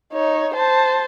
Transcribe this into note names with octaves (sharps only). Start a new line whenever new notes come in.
D#4 C#5
C5 A5